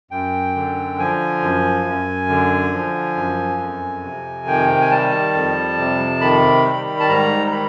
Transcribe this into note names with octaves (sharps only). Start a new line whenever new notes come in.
F#2 G5
D3
F3 G#5
F#2
F#2
D3
F3
F#2
F2
C3
D#3 G5
G#5
G3 A5
F2
C3
D#3 B5
G3
A5
G#2 A#5
A#5
D#3 B5